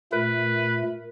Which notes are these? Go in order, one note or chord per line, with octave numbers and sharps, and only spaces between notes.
A#2 A3 A#4 B4